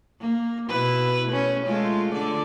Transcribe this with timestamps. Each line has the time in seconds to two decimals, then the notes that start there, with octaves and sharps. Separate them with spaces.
0.20 A#3
0.68 B2 E4 B4
1.28 A3 C#4
1.66 G#3 A3 F4
2.13 D3 D5